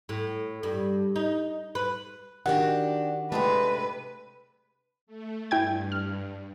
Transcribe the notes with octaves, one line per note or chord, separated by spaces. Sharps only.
A2
G2
D#4
B4
D#3 D4 F#4 G4 D5 F#5
C3 G#3 A3 D4 B4
A3
G2 E4 G5 G#6
F6